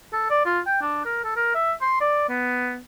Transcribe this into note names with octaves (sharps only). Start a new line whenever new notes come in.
A4
D5
F4
G5
D4
A#4
A4
A#4
E5
C6
D5
B3